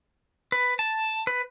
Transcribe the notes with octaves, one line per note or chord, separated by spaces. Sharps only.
B4
A5
B4